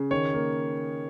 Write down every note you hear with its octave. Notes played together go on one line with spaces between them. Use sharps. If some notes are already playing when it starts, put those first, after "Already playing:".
Already playing: C#3
D#3 C#5
A#3